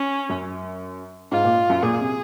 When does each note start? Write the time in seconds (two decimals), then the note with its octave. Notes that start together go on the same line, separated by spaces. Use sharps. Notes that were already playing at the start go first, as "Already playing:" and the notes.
Already playing: C#4
0.29 F#2
1.32 G#2 F4
1.44 A#2
1.70 F#2
1.83 A#2 G#4
2.00 C3